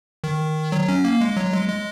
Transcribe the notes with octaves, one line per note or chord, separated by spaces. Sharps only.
D#3
F#3
C#4
A#3
G#3
F#3
G#3
G#3